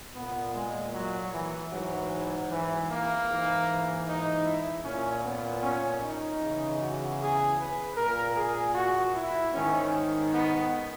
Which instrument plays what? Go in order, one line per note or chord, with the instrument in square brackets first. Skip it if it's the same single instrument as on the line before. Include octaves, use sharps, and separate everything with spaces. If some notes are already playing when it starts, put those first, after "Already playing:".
[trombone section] A#2 B3
G#3
F#3
E3
G#2 E3 F#3
E3
A#3
G#2 E3
D#4
E4
A#2 C#4
B3
C#4
D#4
E2 C#3 E3
F#4
G#4
B4
A#2 A#4
G#4
F#4
E4
G#2 D#3 C#4
B3